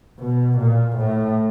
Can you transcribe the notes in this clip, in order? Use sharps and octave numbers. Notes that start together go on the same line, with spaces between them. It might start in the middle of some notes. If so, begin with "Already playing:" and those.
B2
A#2
A2